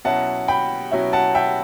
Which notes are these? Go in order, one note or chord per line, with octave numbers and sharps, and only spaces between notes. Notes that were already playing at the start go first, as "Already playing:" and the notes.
B2 F#3 C#4 E4 F#5 A5
G5 B5
B2 F#3 C#4 E4
F#5 A5
E5 G5